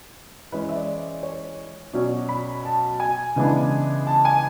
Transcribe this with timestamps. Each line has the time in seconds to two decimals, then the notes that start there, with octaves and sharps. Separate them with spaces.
0.52 E3 G#3 C#4 B4
0.69 E5
0.76 D5
1.23 C#5
1.93 B2 F#3 C#4 D5
2.29 B5
2.65 A5
3.00 G#5
3.36 C#3 E3 G#3 B3 D4
4.07 A5
4.25 G#5